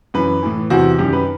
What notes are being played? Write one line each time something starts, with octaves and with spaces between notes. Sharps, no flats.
F#2 E3 B4
A2 E3
E2 C3 E3 F#4
F#2 D#3 G4
B4